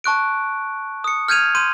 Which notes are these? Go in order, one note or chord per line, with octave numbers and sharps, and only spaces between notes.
A5 C#6 F#6 D7
D#6 C#7
F6 G6 G#6 D#7 F7
C6 G6 D#7